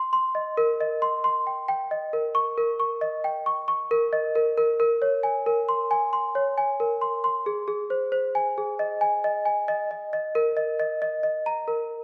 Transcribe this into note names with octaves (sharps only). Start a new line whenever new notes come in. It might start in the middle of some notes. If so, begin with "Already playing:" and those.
Already playing: C6
C6
D#5
A#4
D#5
C6
C6
G5
G5
D#5
A#4
C#6
A#4
C#6
D#5
G5
C#6
C#6
A#4
D#5
A#4
A#4
A#4
C#5
G#5
A#4
C6
G#5
C6
C#5
G#5
A#4
C6
C6
G#4
G#4
C5
C5
G#5
G#4
D#5
G#5
D#5
G#5
D#5
D#5
D#5
A#4
D#5
D#5
D#5
D#5
A#5
A#4